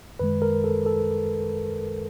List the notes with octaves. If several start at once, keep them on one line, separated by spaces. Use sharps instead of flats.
F#2 D#3 G#3 B4
A#4
A4
A4